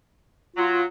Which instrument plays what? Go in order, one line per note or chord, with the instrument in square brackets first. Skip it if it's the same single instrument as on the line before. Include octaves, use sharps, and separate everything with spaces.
[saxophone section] F#3 [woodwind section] F4